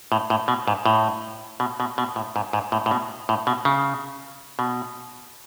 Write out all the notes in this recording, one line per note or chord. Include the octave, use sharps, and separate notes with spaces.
A2
A2
B2
G#2
A2
B2
B2
B2
A2
G#2
G#2
A2
A2
B2
A2
B2
C#3
B2